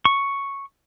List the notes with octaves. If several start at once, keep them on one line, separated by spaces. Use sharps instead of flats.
C#6